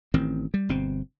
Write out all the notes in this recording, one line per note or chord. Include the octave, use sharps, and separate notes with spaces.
A1 D#3 C4
G3
G1 B2 C4